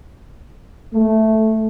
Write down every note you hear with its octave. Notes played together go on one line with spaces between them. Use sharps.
A3